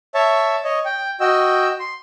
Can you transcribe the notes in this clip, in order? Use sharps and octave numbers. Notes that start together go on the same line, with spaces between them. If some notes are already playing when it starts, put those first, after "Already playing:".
C#5 E5 A5
C#5 D#5
G5
F#4 D#5 G5 E6
C6